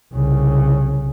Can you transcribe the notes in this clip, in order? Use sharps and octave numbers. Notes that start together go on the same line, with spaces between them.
C2 C#3